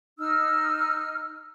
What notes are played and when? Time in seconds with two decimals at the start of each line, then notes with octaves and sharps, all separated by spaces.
0.19 D#4 E6 F6